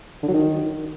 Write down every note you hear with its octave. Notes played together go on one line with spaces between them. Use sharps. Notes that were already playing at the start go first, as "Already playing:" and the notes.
D3
F#3
D#3